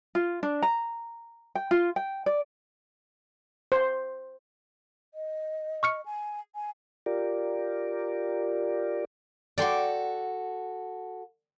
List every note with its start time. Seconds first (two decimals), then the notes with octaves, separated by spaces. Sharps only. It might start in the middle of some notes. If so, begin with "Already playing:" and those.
0.15 F4
0.43 D4
0.63 A#5
1.55 G5
1.71 F4
1.96 G5
2.26 D5
3.72 C5
5.14 D#5
5.83 C#6 F6 C#7
6.06 G#5
6.55 G#5
7.06 F4 G4 A#4 D5
9.58 F#4 A4 D5 G5 C6